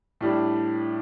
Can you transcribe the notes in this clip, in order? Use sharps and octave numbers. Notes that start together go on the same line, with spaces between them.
A2 G3 D4